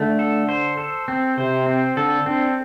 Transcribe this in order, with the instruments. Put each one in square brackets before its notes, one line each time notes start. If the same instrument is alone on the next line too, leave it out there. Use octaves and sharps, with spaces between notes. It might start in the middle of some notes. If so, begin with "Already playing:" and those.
Already playing: [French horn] D3 [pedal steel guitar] A3
[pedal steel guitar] A4
C5
A4
C4
[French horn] C3 [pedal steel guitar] C5
[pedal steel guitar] C4
[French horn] D3 [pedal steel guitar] A4
[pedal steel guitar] C4 [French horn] D4